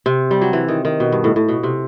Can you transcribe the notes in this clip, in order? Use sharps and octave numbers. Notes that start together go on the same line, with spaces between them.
C3
G3
F#3
E3
D#3
D#3
B2
G2
A2
A2
B2
C3